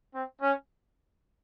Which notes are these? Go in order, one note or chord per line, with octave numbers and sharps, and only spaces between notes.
C4
C#4